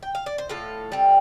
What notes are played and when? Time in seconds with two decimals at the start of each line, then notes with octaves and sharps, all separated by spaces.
0.03 G5
0.15 F5
0.26 D5
0.38 C5
0.49 A2 F4 A4
0.92 G3 C4